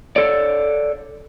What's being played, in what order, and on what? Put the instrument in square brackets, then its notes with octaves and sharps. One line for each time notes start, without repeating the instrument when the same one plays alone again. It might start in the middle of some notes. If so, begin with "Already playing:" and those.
[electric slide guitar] A4 C#5 D5